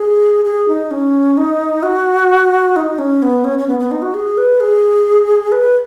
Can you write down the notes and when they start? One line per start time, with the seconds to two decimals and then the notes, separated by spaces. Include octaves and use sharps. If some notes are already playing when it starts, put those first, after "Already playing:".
Already playing: G#4
0.45 G#4
0.68 D#4
0.91 C#4
1.37 D#4
1.83 F#4
2.76 D#4
2.99 C#4
3.22 B3
3.44 C#4
3.58 C#4
3.68 B3
3.79 B3
3.91 D#4
4.02 F#4
4.14 G#4
4.38 B4
4.60 G#4
5.52 B4